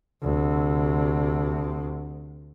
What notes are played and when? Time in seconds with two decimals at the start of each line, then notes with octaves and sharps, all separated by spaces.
0.23 D2 C3